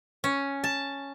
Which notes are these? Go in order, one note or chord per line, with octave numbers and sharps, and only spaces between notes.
C#4
A5